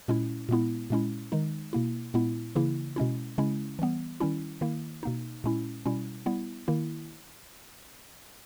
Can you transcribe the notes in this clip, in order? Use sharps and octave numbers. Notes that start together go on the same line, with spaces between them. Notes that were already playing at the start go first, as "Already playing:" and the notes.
A#2 G#3 C#4 E4
A#2 G#3 B3 E4
A#2 G#3 C#4 E4
D#3 G#3 D#4
B2 A#3 E4
A#2 G#3 B3 E4
C#3 E3 A#3 E4
B2 G#3 C#4 E4
C#3 G#3 C#4 E4
E3 G3 B3
D#3 G3 C#4 E4
D#3 A#3 E4
B2 A#3 D#4
A#2 G#3 C#4 E4
B2 G3 C#4 E4
G3 B3 E4
D#3 A#3 E4